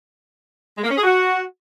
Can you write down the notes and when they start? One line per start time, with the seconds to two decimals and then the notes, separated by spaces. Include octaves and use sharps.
0.77 G#3
0.84 A#3
0.90 C#4
0.97 G#4
1.03 F#4